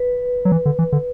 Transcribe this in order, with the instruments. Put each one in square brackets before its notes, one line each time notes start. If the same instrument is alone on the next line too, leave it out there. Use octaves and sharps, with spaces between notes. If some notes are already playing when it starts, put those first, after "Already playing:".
Already playing: [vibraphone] B4
[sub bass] F#3
E3
D3
E3
D3